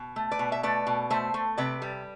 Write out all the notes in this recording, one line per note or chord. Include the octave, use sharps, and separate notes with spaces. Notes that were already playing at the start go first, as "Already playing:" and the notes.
Already playing: B2
A3
B4 D5
B2
E5
A3 B4 D5
B2
A3 C5 E5
A3
C3 B4 D5
G3